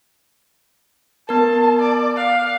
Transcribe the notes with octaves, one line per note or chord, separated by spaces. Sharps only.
B3 A#4 A5
D5
F5 F#6